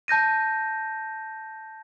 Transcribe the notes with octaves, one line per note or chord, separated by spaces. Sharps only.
A5 G6 A#6 D#7